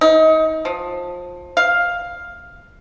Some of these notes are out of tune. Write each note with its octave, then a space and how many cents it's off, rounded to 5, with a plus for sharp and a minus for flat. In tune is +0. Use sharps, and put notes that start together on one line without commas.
D#4 +30
F3 +20
F5 +5